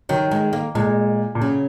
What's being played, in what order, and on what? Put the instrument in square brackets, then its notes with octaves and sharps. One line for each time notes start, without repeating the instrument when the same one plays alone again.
[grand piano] D#3 [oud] F#3
[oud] G#3
A#3
[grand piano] A#2 [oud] G#3
[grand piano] A#2
[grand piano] C#3 [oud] F#3